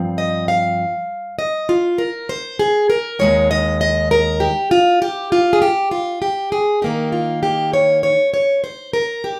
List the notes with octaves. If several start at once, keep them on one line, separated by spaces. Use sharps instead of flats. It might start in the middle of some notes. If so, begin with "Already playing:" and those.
Already playing: G2 F3 C4
D#5
F5
D#5
F4
A#4
C5
G#4
A#4
D#2 C#3 G#3 D#4 C#5
D#5
D#5
A#4
G4
F4
G4
F4
G#4
G4
F4
G4
G#4
D#3 A#3 D#4 G4
F4
G4
C#5
C#5
C#5
C5
A#4
G4